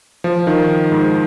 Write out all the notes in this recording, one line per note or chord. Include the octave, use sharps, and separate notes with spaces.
F3
D#3
G#2